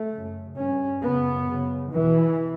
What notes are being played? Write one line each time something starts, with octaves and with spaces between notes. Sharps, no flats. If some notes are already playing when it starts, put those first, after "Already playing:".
Already playing: A3
F#2 C#3
G2 C#4
F#2 C#3 B3
F#2 C#3
E2 B2 E3